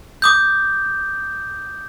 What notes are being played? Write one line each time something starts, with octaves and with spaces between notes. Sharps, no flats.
D6 D#6 G6